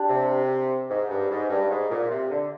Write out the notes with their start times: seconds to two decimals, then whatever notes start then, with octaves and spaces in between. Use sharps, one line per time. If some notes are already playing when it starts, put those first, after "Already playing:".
Already playing: D4 G4
0.09 C3
0.90 G#2
1.09 G2
1.30 G#2
1.50 G2
1.70 G#2
1.90 A#2
2.10 C3
2.30 D3